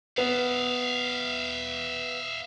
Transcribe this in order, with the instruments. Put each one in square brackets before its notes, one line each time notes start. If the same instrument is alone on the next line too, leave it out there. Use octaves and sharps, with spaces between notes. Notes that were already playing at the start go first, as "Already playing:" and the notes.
[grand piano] B3 [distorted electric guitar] E5 F5